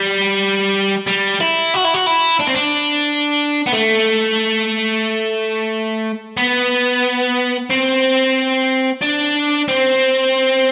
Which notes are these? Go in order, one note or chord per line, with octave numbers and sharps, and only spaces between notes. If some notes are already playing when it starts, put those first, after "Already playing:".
Already playing: G3
G3
E4
F#4
E4
F#4
E4
D4
C4
D4
B3
A3
B3
C4
D4
C4